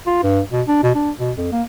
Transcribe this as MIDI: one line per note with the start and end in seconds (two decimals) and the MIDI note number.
0.06 0.22 65
0.23 0.41 43
0.52 0.62 47
0.68 0.78 62
0.83 0.90 47
0.95 1.11 62
1.19 1.32 47
1.37 1.48 41
1.52 1.63 58